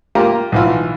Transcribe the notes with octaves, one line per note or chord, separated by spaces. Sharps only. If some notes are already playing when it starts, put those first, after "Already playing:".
A#3 F4 G4 A#5
B1 E3 F4